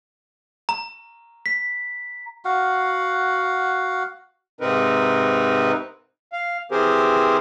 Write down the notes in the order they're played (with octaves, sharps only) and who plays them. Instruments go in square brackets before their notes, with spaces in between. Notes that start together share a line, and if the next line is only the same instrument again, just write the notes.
[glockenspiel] A#5
B6
[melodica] F#4 F5 F#5
[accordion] G#2 C3 C4 D#4 A#4 B4
F5
E3 C4 G4 G#4 A#4 C5